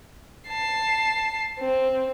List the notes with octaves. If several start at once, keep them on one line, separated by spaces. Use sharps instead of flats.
A5 C7
C4